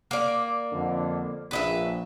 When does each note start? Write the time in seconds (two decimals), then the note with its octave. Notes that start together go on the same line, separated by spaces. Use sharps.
0.11 A#3 D5
0.72 F2 D3
1.51 A#1 B4 D#5 E5